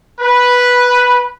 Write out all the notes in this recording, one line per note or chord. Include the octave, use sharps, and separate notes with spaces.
B4